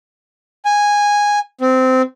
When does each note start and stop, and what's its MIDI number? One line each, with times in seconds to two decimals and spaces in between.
0.65 1.39 80
1.61 2.02 60